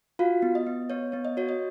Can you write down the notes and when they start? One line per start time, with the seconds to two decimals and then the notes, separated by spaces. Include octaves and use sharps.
0.19 F4 F#4 F5
0.42 B3
0.55 D#5
0.67 B3
0.90 B3 C#5
1.12 B3 C#5
1.25 D#5
1.37 F#4 C#5
1.49 D#5